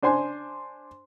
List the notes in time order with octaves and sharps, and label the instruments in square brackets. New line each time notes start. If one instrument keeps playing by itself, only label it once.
[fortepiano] D4 C5 G#5 C6